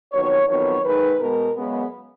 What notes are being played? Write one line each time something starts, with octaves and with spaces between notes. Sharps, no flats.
F2 D#3 F#3 B3 C#5
F2 D#3 F#3 B3 C#5
G#2 D#3 G#3 B4
B2 G#3 B3 A#4
F#2 C#3 G#3 B3